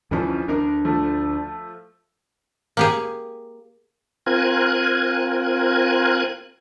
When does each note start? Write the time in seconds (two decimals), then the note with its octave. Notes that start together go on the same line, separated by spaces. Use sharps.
0.11 D2 E3 F3 C#4
0.48 D2 D4 A#4
0.85 F3 A3
2.77 A#3 G4 G#4
4.26 C4 F4 A#4 G#5 F#6 G#6